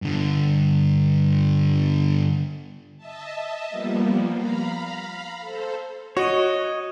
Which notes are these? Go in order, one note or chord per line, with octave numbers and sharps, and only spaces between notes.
G2 D3
D#5 E5 A5
F3 G3 A#3 B3
F5 A#5 B5
A4 C5
F#4 C#5 D#5